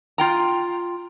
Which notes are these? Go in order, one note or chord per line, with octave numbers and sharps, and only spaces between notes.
F4 G5 A#5